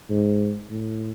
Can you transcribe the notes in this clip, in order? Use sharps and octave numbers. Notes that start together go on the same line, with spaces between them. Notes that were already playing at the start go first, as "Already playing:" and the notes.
G#2
A2